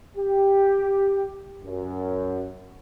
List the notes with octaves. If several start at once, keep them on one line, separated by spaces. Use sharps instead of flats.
G4
F#2